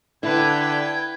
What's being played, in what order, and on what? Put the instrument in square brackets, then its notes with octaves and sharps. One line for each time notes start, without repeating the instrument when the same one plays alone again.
[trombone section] D3 [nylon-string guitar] E4 [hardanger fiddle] B4 G5 [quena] G#6